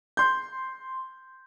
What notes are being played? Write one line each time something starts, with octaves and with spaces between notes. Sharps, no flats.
C6 G6